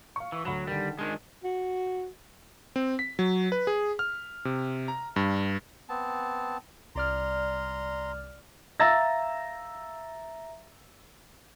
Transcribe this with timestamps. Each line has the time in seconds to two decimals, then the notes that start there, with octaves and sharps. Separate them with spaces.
0.16 F5 C#6
0.32 E3
0.45 D2 F#3 B5 E7
0.67 D3 D#3 G3
0.99 D#3 G#3 D4
1.44 F#4
2.76 C4
2.99 B6
3.19 F#3
3.52 B4
3.67 G#4
3.99 F6
4.45 C3
4.88 A#5
5.16 G2
5.89 B3 C4 A5
6.95 C2 D5 A#5 C6 F6
8.80 E5 F5 A#5 E6 A6 A#6